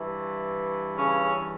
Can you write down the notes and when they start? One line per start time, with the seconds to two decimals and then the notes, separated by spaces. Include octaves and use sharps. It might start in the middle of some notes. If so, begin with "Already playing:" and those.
Already playing: G2 E3
0.97 C#3 C#4